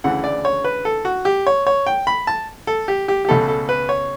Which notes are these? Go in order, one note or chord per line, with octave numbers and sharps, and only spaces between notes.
D2 C#3 E3 F#5
D5
C#5
B4
A4
F#4
G4
C#5
C#5
G5
B5
A5
A4
G4
G4
G4
C#2 B2 A3 A4
A4
B4
C#5